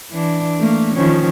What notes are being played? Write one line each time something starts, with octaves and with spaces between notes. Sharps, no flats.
E3 D4
A3 A#3
D#3 F3 C#4